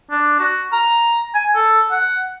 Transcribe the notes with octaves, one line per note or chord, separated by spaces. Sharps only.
D4
F#4
A#5
G#5
A4
F#5